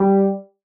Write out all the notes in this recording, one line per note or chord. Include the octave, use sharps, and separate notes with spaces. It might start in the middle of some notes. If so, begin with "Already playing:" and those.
Already playing: G3